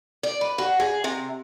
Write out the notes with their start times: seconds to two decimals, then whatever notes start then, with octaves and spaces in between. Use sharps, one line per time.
0.23 D5
0.41 B4
0.58 F#4
0.80 G#4
1.04 C3